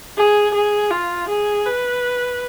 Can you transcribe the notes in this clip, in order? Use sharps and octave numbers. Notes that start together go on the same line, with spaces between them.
G#4
G#4
F4
G#4
B4